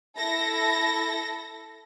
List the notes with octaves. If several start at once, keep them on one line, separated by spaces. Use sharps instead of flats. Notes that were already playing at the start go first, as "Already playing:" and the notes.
E4 A4 A#6